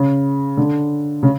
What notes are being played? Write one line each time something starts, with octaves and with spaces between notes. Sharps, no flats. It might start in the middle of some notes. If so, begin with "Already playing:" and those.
Already playing: C#3
D3
C#3